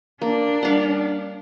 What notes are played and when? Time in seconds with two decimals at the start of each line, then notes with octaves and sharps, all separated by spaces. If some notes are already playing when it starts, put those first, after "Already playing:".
0.22 A#3 D4
0.63 G3 F5 F#5